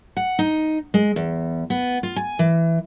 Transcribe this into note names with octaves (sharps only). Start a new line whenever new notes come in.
F#5
D#4
G#3
E2
B3
F4
G#5
E3